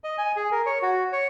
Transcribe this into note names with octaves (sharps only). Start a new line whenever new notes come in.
D#5
G#5
G#4
A#4
C#5
F#4
C#5